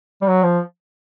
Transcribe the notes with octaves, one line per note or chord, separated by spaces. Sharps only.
G3
F#3
F3